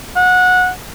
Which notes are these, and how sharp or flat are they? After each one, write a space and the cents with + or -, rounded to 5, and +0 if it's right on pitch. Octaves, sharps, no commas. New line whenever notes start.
F#5 -20